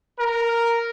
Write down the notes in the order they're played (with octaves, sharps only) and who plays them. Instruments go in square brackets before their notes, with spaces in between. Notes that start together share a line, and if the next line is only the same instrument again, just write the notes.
[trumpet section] A#4